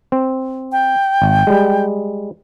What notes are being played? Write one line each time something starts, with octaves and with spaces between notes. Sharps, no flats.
C4
G5
G#1
G3 G#3